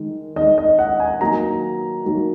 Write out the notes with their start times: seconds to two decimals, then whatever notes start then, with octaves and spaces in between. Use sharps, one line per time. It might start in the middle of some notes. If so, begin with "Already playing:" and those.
Already playing: D#3 G#3
0.36 D#3 G#3 D#5
0.58 D#5
0.79 F#5
1.00 G#5
1.21 D#3 F#3 A#3 A#5
2.05 D#3 F#3 A#3